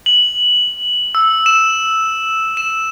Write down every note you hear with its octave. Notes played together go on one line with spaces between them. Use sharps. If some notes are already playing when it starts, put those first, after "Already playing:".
F#7
E6
E7
E7